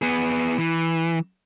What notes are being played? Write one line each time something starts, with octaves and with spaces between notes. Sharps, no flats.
B3 G#4
E3